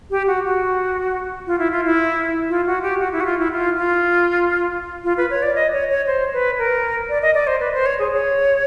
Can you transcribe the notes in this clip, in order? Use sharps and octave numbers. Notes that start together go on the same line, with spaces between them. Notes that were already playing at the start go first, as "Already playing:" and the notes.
G4
F#4
F#4
F4
E4
F4
E4
F4
F#4
G4
F#4
E4
F#4
F4
E4
F4
F4
F4
B4
C#5
D5
D#5
C#5
C#5
C5
B4
A#4
D5
D#5
D5
C5
B4
C5
C#5
G#4
C#5